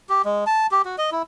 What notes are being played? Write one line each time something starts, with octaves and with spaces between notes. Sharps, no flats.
G4
G#3
A5
G4
F#4
D#5
E4